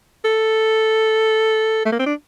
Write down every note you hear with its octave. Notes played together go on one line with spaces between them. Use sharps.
A4
A3
A#3
C4
D4